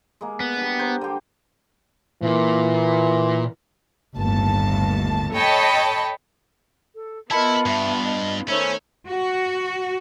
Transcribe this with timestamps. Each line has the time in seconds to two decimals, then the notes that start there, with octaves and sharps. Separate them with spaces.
0.21 G#3 A#3
0.40 B3
0.56 G3 D4
0.79 A#4 C5
1.01 D3 G4
2.22 A#2 E3 A#3
4.17 G1 D#2 A2 A5
5.32 A4 C#5 D#5 G5 A5 B5
6.95 A4
7.31 B3 E4 F4 A#4 D#5 A5 B5 C#7
7.66 G2 E5
8.05 D#5
8.48 D#3 A3 C#4 C5 C#5 E5 B5
9.09 F#4